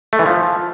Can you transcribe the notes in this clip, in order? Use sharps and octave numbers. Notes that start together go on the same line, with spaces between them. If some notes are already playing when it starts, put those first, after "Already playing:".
A3
E3
F3